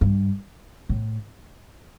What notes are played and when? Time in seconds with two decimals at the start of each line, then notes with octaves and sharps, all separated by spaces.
0.01 G2
0.89 A2